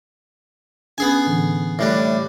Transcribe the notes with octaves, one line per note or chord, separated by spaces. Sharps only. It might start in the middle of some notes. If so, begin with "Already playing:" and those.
B3 C#4 D4 G#4 G#5
A2 D3 E3
A2 G3 D4 D5 E5
E5